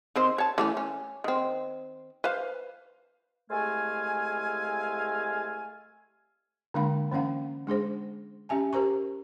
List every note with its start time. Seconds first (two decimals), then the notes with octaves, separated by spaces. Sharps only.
0.16 D#3 C4 C5
0.38 C#5 A5
0.58 E3 A3 C#4
0.77 C#4
1.24 D#3 C4
2.24 B4 C5 F5
3.50 C2 G#3 A3 A4 F5 G#5
6.74 D3 G#3 A#3 D4 F5 B5
7.11 E3 A#3 C#4 F5 F#5
7.67 G#3 D4 G#4 C5
8.49 C#4 G4 E5 G#5 A5
8.73 G4 A#4 C5 A#5 C#6